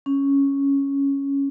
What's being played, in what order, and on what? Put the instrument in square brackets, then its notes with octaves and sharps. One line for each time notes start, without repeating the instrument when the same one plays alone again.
[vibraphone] C#4